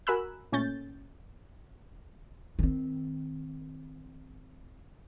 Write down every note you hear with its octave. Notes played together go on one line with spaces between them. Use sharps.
F#4 A#4 G#5 B5 E6 F#6
A#2 A3 C#4 C#5 G6 A6
D#3 C4